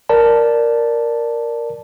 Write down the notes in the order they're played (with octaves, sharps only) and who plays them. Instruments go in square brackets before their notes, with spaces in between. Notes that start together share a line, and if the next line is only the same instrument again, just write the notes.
[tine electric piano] A#4 D5 A5